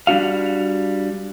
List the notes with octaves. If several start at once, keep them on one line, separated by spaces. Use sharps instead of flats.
G3 D4 F#4 F5